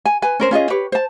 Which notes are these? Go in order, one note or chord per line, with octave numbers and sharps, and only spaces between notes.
G#5
B4 G#5
C#4 A#4 C5
C#4 F4 G#4 D#5
G4 B4 C#5
C5 A5